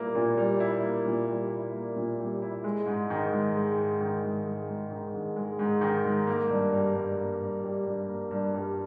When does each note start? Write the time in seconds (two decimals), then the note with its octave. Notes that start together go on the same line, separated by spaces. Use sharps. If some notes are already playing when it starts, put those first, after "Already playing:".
Already playing: A#2 G3 A#3 E4
0.15 A#2
0.37 G3
0.60 E4
0.83 A#3
1.05 A#2
1.28 G3
1.51 E4
1.73 A#3
1.96 A#2
2.19 G3
2.42 E4
2.64 G#3
2.86 G#2
3.10 D#3
3.32 G#2
3.55 G#3
3.78 G#2
4.00 D#3
4.23 G#2
4.46 G#3
4.68 G#2
4.91 D#3
5.14 G#2
5.36 G#3
5.59 G#2
5.81 D#3
6.05 G#2
6.27 A#3
6.50 G2
6.72 G3
6.95 G2
7.18 A#3
7.41 G2
7.64 G3
7.86 G2
8.08 A#3
8.31 G2
8.54 G3